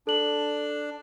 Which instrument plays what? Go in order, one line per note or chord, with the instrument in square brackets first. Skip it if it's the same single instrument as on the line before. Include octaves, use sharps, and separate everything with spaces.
[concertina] D4 [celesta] A4 F#7